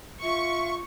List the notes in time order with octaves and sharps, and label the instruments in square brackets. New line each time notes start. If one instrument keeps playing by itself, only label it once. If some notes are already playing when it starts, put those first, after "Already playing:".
[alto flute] F4 [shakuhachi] E5 [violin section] C#6